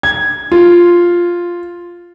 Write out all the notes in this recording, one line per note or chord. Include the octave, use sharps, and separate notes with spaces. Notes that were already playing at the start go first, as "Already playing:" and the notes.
G#6
F4